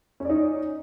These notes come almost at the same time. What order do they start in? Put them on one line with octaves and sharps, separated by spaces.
C#4 D5 D#4